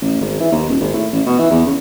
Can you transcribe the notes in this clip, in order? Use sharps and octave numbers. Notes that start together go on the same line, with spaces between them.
A1
G#1
E3
D#2
D#1
G#1
A2
A1
B2
E3
E2
C#3